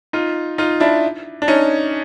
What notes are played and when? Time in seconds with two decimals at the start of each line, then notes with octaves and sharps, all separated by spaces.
0.13 D#4 F4
0.58 D#4 F4
0.80 D4 E4
1.42 D4
1.48 C#4 D#4